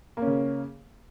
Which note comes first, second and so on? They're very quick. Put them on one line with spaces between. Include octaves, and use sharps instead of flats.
A#3 C#4 C#3